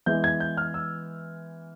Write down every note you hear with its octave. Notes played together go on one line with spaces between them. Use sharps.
E3 G#3 B3 G6
G#6
G6
F6
E6